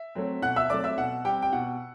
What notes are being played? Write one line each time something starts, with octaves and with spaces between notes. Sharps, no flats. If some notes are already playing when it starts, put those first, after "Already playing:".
Already playing: E5
F#3 A3 C4
B2 F#5 F#6
E5 E6
F#3 A3 C4 D5 D6
E5 E6
B2 F#5
G3 C4 G4 G5
G5
B2 F#5